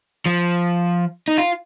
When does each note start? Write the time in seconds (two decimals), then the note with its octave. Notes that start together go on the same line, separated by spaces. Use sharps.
0.26 F3
1.28 D#4
1.38 F4